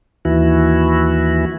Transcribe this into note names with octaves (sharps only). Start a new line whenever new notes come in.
D#2 E3 E4 F#4